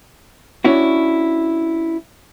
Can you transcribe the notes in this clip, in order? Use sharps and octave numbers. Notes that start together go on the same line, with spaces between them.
C#4 D4 E4 F#4